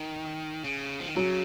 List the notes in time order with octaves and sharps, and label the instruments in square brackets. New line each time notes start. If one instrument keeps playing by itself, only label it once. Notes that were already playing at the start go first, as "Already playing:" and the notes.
Already playing: [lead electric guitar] D#3
C#3
F3
D#3
[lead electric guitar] C#3 [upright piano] F#3